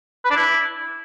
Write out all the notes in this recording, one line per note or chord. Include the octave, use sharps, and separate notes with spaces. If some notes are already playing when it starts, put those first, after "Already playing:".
B4
D4
E4